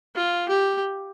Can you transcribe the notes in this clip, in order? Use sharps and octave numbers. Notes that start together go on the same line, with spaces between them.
F4
G4